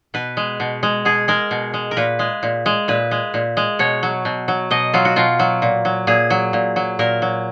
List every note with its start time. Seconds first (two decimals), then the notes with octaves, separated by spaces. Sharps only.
0.14 B2 B4
0.37 G#3
0.60 B2
0.83 G#3
1.05 B2 G#4
1.28 G#3 A#4
1.51 B2
1.74 G#3
1.91 A#4
1.97 A#2 B4
2.19 G#3
2.43 A#2
2.66 G#3
2.88 A#2 B4
3.11 G#3
3.34 A#2
3.57 G#3
3.79 B2 C#5
4.03 F#3
4.25 B2
4.48 F#3
4.71 B2 D#5
4.94 F#3 F4
5.05 F#4
5.16 B2 F4
5.39 F#3
5.62 A#2
5.85 F#3
6.07 A#2 G#4
6.30 F#3
6.53 A#2
6.76 F#3
6.99 A#2 A#4
7.22 F#3